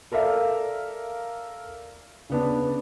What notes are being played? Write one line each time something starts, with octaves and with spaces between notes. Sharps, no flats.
A4 A#4 D5 E5 F5
C#3 B3 D4